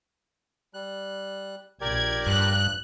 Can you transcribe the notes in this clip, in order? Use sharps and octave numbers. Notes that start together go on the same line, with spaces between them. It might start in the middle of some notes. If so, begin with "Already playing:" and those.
G3 F#6
A#1 G4 A#4 D5 G#6
G2 F#6